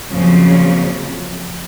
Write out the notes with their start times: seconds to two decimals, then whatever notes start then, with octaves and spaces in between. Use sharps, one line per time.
0.10 F2 A#2 C#3 F3 F#3